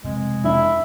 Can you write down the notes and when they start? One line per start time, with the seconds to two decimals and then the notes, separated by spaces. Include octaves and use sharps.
0.04 F1 B2 G#3 C4
0.44 F2 D4 E4 E5